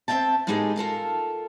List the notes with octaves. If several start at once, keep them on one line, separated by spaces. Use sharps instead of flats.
C4 C#4 E5 G5 A5
A2 G#3 B3 D#4 G4 G#4
F4 A4 A#4 F5